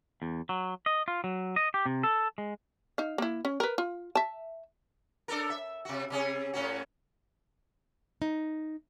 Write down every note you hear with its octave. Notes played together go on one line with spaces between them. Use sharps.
E2
F#3
D#5
F4
F#3
D#5
G4
C3
A4
G#3
D#4 F5
A#3 E4
C#4
A#4 B4
F4
E5 A5
D4 A4 A#4
E5
C3 F#4
C3 C#4 G#4
A2 C#4 F#4
D#4